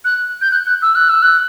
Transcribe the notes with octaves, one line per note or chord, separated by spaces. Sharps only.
F#6
G6
F#6
F#6
E6
F#6
E6
F#6